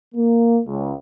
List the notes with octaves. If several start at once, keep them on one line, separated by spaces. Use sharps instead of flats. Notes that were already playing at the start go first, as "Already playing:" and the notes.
A#3
C#2